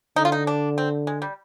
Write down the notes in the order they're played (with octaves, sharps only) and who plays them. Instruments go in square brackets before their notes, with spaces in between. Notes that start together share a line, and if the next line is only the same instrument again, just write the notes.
[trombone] D3 [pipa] D#4
[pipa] F4
D#4
D4
C4
G#3
G3